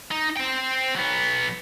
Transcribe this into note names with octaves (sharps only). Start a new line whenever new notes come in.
D#4
C5 G5
F#3 B3